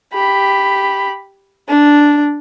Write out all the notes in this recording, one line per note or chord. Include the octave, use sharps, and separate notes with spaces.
G4 B5
D4